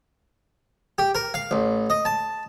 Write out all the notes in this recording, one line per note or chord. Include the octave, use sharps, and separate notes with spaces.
G4
A#4
F5
A1
D#5
A5